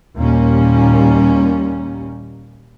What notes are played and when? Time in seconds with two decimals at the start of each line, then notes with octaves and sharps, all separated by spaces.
0.16 D#2 A#2 G3 A#3 C#4